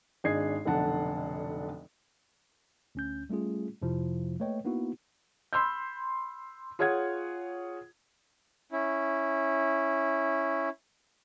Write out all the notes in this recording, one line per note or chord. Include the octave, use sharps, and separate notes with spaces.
G#1 D4 G#4 D#5 G#6 C7
F1 B1 D3 D4 F#5 A5
D2 C#4 G6
G3 A3 C#4 F4 G#4
F2 C3 F3 E4
A3 A#3 B4 C#5 D#5 G5
A#3 B3 D#4 E4 F#4
B5 C6 E6 G6
F4 G#4 C#5 F#5 G#6
C#4 E4